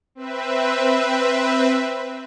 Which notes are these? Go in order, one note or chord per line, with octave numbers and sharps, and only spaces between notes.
C4 B4 E5